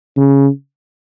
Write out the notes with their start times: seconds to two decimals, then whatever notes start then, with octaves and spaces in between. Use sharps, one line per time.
0.17 C#3